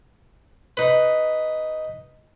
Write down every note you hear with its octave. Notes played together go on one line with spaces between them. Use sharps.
D#4 B4